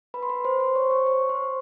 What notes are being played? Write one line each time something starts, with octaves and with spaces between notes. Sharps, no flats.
B4 B5
C6
B4 B5
C5 C6
C5 C6
C#5 C#6
C#5 C#6
C#5 C#6
C5 C6